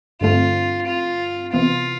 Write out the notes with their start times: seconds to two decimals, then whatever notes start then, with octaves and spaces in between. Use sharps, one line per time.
0.21 G2 D3 A3 C4 F4
0.87 F4
1.52 C3 E3 B3 F4